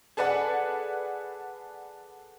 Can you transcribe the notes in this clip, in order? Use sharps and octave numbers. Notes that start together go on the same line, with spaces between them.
G#4 A4 B4 D5 F#5